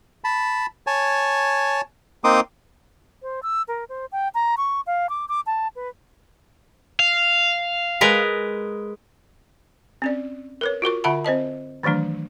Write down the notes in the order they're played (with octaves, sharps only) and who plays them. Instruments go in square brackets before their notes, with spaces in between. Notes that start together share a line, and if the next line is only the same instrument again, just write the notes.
[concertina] A5 B5
C#5 G#5 A5
A#3 C4 D#4 C6 D6 D#6
[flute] C5
E6
A#4
C5
G5
A#5
C#6
F5
D6
D6
A5
B4
[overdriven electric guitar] F5
[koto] G#3 A#4 B4
[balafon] C4 C#4 D5
A#4 B4 C#5
F4 F#4 A#4 C#6
D3 F4 E5 F#5 A5 B5
C4 C5 D#5 A5
D#3 E3 F#3 A3 D4